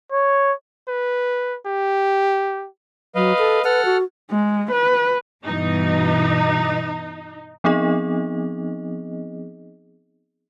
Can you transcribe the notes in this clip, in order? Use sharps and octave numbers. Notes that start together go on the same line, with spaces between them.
C#5
B4
G4
F#3 B4 D#5 F5
A4
A4 B4 F#5 F6
F#4
G#3
B4
G2 B2 E3 D#4
F3 B3 C4 D#4 G#4 D#5